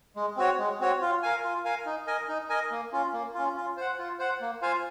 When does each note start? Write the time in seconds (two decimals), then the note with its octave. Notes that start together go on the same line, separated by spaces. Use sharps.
0.16 G#3
0.37 C4 F#4 C#5
0.59 G#3
0.80 C4 F#4 C#5
1.01 F4
1.23 A#4 F5 G#5
1.44 F4
1.65 A#4 F5 G#5
1.86 D#4
2.07 A#4 D#5 G#5
2.28 D#4
2.49 A#4 D#5 G#5
2.71 A#3
2.92 C#4 F4
3.13 A#3
3.35 C#4 F4
3.56 F4
3.77 C5 F#5
3.99 F4
4.19 C5 F#5
4.41 A#3
4.62 F4 C5 F5 G#5